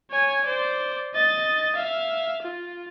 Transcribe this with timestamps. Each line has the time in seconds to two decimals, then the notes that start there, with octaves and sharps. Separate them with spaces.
0.11 C#5 G#5
0.45 C5 D5
1.14 D#5 A6
1.76 E5 F5
2.42 F4